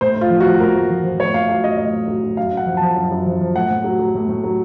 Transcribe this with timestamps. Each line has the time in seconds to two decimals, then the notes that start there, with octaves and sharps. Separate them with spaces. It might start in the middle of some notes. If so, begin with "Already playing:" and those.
0.01 A2 C5
0.16 A2
0.21 F4
0.30 F3
0.40 F#4
0.46 F3
0.60 A2 A#4
0.75 A2
0.90 F3
1.04 F3
1.19 A2 C#5
1.34 A2 F5
1.49 F#3 F5
1.64 F#3 D#5
1.78 A2 D#5
1.93 A2
2.08 F#3
2.23 F#3
2.37 F#2 F5
2.52 F#2
2.57 F#5
2.66 F3
2.77 F3 A5
2.96 F#2
3.11 F#2
3.26 F3
3.41 F3
3.55 A2 F#5
3.70 A2
3.84 F#3
3.99 F#3
4.15 A2
4.29 A2
4.44 F#3